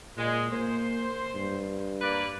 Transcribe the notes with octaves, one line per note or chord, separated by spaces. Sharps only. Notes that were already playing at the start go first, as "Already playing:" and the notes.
A#2 G#3
A#3 C5
G2
A#3 B4 D5